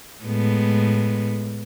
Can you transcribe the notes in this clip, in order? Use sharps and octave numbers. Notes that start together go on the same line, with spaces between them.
A2 G#3 B3